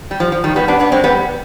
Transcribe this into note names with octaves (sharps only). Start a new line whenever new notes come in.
G3
F3
F3
D#3 G3
G3 B3
B3 D4
B3 D4
G#3 C4
G3 B3